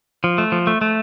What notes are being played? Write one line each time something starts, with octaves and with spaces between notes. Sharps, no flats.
F3
A3
F3
A3
A3